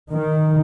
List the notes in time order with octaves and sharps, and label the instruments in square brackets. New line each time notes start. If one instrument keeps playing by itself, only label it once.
[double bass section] D#3